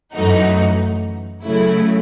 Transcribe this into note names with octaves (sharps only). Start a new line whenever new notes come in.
F#2 E3 A3 D#4 F#4
C#3 F#3 A3 E4